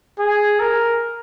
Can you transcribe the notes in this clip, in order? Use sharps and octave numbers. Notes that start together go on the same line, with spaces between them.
G#4
A#4